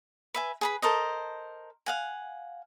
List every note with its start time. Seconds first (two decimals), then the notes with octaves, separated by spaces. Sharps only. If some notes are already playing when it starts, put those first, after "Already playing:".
0.34 B4 E5 G#5
0.61 G#4 B4 B5
0.82 A4 A#4 C5 D#5
1.86 F5 F#5 G#5